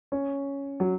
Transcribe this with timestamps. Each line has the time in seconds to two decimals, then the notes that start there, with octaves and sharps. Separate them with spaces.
0.12 C#4
0.80 F#3